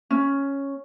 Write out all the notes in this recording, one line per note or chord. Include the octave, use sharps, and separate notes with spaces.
C#4